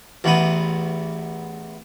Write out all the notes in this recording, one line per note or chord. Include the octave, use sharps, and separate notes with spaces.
A1 E2 B3 D#6